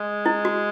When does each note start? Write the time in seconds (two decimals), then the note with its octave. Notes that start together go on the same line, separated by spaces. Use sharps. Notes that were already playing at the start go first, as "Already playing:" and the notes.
Already playing: G#3
0.26 E4
0.45 F#4